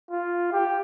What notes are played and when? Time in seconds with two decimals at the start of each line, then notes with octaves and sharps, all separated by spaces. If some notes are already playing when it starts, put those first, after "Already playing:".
0.11 F4
0.53 G4